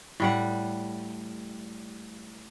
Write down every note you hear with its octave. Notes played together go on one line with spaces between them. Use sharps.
A2 G3 F#5